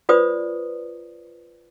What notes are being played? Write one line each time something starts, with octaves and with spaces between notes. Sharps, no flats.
F4 B4 C5 D5 D#6